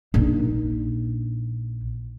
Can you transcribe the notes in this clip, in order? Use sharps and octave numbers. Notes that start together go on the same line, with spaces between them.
A#1 D#4